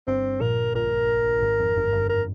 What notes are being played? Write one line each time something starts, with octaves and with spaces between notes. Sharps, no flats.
G1 G2 C4
A#1 A#2 A#4
A#1 A#2 A#4
G#1 G#2
F2
G1 G2
G1 G2
A#4